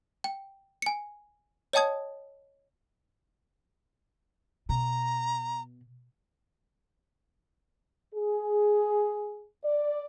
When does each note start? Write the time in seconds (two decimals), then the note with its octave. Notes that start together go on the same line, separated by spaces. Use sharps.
0.24 G5
0.82 G#5 C#7
1.73 C#5 D#5 G5 A5 D#6 G#6
4.69 B2 A#5
8.14 G#4
9.65 D5